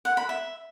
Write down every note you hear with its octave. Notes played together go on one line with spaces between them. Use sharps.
F#5
B5
E5